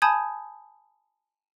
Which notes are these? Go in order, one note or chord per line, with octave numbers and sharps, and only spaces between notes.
G#5 A5 B5 D#6 G6 G#6